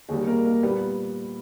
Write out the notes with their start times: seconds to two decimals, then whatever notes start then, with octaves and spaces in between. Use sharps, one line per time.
0.09 D#2 D#3 G3 G#3 G#4
0.27 A#3 A#4
0.45 A#3 A#4
0.63 A#2 G3 B3 B4